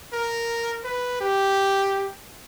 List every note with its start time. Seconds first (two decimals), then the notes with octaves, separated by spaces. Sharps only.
0.13 A#4
0.84 B4
1.20 G4